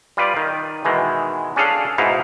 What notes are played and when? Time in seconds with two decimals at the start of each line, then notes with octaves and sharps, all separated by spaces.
0.17 G3 F4 B4 D5
0.37 D#3
0.85 B2 D#3 E3 G#3
1.56 C#4 D4 G#4 A4 F5
1.98 G#2 B2 D#4 E4 F5